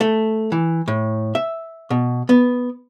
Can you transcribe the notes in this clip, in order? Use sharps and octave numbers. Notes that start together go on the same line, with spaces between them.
A3
E3
A2
E5
B2
B3